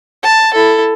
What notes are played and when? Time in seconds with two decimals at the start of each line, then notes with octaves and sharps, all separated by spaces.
0.23 A5
0.54 E4 A4